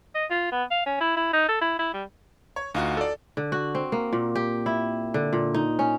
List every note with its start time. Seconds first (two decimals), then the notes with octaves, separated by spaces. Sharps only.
0.15 D#5
0.30 F4
0.51 B3
0.71 F5
0.86 C#4
1.01 E4
1.16 E4
1.33 D#4
1.49 A4
1.61 E4
1.79 E4
1.94 G3
2.56 C#5
2.74 D2 D#4 F4 F#4
2.97 A4 D5
3.37 D3
3.52 F#4
3.75 C4
3.92 A#3
4.13 A#2
4.35 G4
4.66 E4
5.14 D3
5.33 A#2
5.54 D#4
5.79 C#4